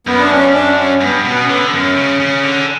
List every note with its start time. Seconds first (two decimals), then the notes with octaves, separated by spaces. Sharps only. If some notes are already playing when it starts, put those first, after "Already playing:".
0.07 F#2 B3
0.19 D4
0.30 C#4
0.54 D4
0.78 C#4
1.01 G2 B3
1.25 B2 B3
1.43 C#4
1.49 D3 B3
1.73 F#2 C#4
1.97 C#3
2.20 C#3
2.44 D3